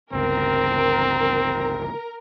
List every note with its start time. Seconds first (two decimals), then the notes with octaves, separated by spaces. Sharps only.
0.13 G1 C#2 C4 A#4